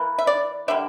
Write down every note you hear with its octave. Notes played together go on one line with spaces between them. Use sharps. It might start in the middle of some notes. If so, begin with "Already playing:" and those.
Already playing: E3 A#3
E5
D5
D3 G3 A#3 E5